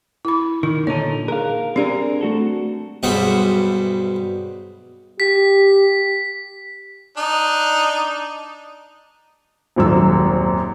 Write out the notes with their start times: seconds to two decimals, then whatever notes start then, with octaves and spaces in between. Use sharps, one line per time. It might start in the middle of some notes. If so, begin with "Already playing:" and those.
0.25 E4 B5
0.63 D#3 D#4
0.87 A#2 D3 D#4 C#5 A5
1.28 G#4 A#4 F5
1.76 C4 D4 G4 G#4 A#4 D5
2.21 A3 F#4 A4
3.03 B1 G2 G#3 C5 F#5 B5
5.20 G4 B6
7.17 D4 D#4
9.76 D#1 G#1 F#2 E6